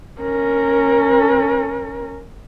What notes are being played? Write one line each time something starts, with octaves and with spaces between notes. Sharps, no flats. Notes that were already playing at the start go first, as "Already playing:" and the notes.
C#4 A#4